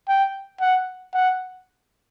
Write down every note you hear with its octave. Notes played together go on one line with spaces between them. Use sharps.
G5
F#5
F#5